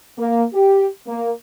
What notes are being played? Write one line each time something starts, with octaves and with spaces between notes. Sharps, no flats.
A#3
G4
A#3